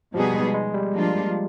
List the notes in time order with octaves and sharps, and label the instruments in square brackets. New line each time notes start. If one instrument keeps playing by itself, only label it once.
[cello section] B2 G3 B3 D#4 G#4 [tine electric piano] F3
[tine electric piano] G#3
G#3
G3
[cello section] F3 A#3 D4 F4